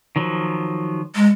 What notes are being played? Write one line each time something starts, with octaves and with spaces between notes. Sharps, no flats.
D#3 F3 F#3
G#3